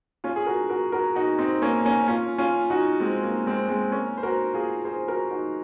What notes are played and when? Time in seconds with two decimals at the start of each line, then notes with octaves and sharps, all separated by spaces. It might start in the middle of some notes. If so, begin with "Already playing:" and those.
0.24 C#4 F4
0.36 G#4
0.46 F#4 A#4
0.70 F#4 A#4
0.92 F#4 A#4
1.15 D#4 F#4
1.39 C4 D#4
1.62 A#3 C#4
1.85 A#3 C#4
2.08 C#4 F4
2.38 C#4 F4
2.70 D#4 F#4
3.00 G#3 C4
3.23 A#3
3.47 G#3 C4
3.69 G#3 C4
3.92 A#3 C#4
4.17 C5
4.23 F#4 A#4
4.54 F4 G#4
4.85 G#4 C5
5.08 F#4 A#4
5.31 D#4 F#4